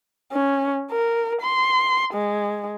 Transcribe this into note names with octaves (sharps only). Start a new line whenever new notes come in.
C#4
A#4
C6
G#3